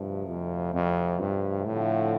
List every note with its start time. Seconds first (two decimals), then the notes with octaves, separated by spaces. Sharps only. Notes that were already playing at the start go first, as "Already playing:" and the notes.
Already playing: D2 G2 C3 F3
0.28 F2
0.74 F2
1.20 G2
1.65 A2 D3 F3 A3 C4